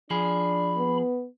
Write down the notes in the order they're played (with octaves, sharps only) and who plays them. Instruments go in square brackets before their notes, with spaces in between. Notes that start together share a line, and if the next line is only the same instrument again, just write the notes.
[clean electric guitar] F3 G#4 [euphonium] D4 [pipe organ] B5
[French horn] B3